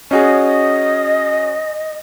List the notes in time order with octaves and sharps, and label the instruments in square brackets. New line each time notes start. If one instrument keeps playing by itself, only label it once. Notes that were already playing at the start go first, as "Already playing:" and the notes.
[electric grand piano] C#4 F#4 G#4 [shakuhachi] D#5